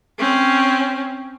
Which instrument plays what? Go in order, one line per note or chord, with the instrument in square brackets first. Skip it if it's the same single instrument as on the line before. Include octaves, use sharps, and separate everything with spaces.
[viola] C4 C#4